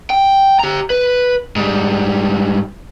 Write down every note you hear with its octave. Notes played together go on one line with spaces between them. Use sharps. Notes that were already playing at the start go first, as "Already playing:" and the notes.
G5
G4 A#5
B4
G#2 G3